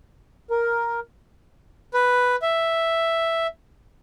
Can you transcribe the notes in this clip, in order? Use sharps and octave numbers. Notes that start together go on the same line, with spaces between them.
A#4
B4
E5